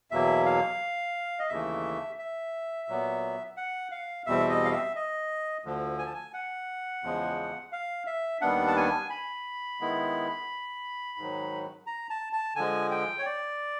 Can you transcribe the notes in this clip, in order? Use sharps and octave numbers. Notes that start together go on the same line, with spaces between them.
E2 B2 F#3 A#3 E5
F5
D#5
D#2 C#3 E3 A3 E5
E5
A#2 F#3 B3
F#5
F5
E2 B2 G3 C4 E5
D#5
F5
E5
D#5
D2 D3 F3
G#5
A5
G#5
F#5
E2 C#3 F3 G#3
F5
E5
D#2 D#3 G3 B3 D4 F#5
A5
G#5
B5
D#3 G#3 B3 E4
G#2 D#3 F#3
A#5
A5
A5
D3 F3 G#3 G#5
G5
C#5
D5